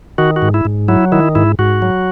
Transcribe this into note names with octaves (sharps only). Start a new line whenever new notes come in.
D#3 F#4
F#4
G#2
E4
G#2
F#3 E4
D#3 E4
G#2 E4
G#2 F#4
F#3